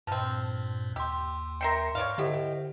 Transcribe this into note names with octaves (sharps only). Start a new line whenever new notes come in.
G2 A#2 F3 C4 A5 F6
D#2 G4 C6 E6
A#4 E5 G5 C6 C7 C#7
G#2 C#5 D5 F5
D3 E4 G4 C5 D#5 G5